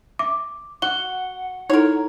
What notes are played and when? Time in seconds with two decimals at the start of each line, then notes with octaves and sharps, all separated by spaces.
0.19 E5 D6
0.82 F#4 F#5 G7
1.70 D#4 E4 A4 A#4 C#5